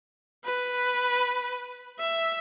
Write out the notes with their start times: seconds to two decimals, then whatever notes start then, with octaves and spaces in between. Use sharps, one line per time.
0.44 B4
1.99 E5